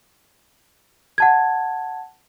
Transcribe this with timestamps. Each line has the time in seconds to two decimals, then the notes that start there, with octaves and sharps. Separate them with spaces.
1.18 F#5 A5 G#6